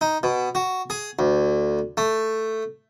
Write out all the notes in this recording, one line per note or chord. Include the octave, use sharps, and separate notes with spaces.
D#4
B2
F#4
G#4
D2
A3